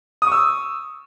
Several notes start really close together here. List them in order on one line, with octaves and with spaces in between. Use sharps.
D#6 C#6 E6